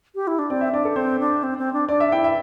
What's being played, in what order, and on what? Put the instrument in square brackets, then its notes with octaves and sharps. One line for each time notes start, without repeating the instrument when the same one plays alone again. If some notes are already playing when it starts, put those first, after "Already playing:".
[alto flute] G4
E4
D4
[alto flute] C4 [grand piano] D5
[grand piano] E5
[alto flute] D4 [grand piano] D5
[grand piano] A4
[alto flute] C4 [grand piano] C5
[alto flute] D4
C4
C4
D4
[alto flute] D4 [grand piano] D5
[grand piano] E5
[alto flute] E4 [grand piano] G5
[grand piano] E5